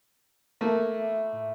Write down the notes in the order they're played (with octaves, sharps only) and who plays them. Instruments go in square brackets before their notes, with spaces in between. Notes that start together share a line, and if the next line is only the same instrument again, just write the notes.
[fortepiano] A3 A#3 [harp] E5
[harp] E5 B5 D6
F4
A2